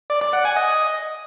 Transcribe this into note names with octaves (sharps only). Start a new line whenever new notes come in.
D5
D5
F#5
G#5
D#5